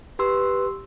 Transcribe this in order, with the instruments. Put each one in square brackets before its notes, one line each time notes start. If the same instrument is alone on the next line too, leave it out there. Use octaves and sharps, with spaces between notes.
[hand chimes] G4 C6 E6 [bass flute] B4